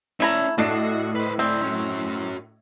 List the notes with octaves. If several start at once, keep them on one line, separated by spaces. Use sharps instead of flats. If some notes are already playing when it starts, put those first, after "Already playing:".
A3 C#4 E4 D5 A#5
A2 A3 D4 F#4 D#5 C7
B4 C5
C4 E4 D5
C#4 F#4